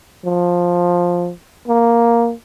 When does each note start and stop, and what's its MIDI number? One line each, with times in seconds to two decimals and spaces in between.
0.25 1.31 53
1.68 2.33 58